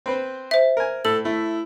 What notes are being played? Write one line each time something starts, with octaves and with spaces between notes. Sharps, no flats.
C4 B4 C5
C5 E5
A#4 G#5
A2 A4 F#7
A3 E4